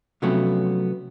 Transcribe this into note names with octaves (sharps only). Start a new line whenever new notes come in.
C3 F3 F#3 A3 B3 C#4